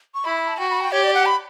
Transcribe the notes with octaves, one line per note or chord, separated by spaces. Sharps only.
C#6
E4 B5
B5
A5
F#4 G5
B5
G5
G4 C#5
D5
F#5
B5